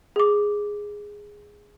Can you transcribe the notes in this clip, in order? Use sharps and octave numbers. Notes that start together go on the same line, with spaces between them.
G#4 D6